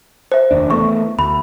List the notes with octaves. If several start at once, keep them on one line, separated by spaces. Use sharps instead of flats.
C5 E5
F1 D#2 D4
E3 A3 B3 C#6
D2 B5